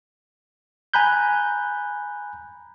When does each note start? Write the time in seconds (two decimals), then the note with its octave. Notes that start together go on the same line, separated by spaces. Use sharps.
0.94 G#5 A#5 B5 F#6 G6